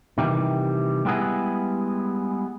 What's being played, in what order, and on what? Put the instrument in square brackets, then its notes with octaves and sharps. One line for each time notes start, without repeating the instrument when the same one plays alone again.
[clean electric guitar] C3 D#3 E3 G3
G3 G#3 B3 E4 G#4